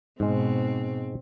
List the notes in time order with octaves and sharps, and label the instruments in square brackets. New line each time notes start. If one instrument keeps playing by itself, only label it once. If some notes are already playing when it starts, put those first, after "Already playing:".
[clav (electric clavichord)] G#2 G#3 [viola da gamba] B2 C4